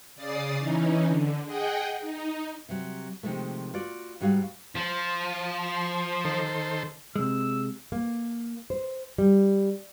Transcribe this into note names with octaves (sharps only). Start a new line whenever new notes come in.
C#3 D5 D#6 A6 C7
E3 C#4 D#4
D3
G#4 D#5 F#5 G5
D#4
C3 F#3
C3 D#3 F3 G#3 A3
F4 F#4 D5
G#2 G3 F#4 G#4 F5
F3
D#3 A4 C5
C3 G#3 E6
A#3
C5
G3